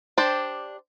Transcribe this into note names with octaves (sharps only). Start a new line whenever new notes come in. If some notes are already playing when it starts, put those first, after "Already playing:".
D4 G4 C5